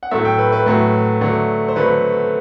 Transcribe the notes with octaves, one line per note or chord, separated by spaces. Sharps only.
F#5
A2 F#3 A3 E5
G5
B4
B4
A2 F#3 A3
D3 F#3 A3
C5
D3 F#3 A3 B4